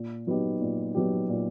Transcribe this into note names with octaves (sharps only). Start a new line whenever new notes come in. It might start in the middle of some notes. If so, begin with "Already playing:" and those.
Already playing: A#2
F#3 B3 D#4 G4
A#2
F#3 B3 D#4 G4
A#2